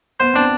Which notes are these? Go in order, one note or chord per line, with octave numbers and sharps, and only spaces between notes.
B3 C5
C4 D4